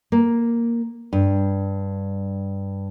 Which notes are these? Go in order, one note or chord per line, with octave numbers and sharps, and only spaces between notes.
A#3
G2